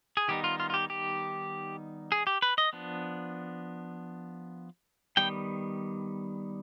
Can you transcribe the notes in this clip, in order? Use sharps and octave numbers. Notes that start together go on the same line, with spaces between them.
G#4
D#3 G3 B3 D#4 G4
F4
F4
F4
G4
G4
G#4
G4
B4
D#5
F3 B3 D4
D#3 G3 B3 G5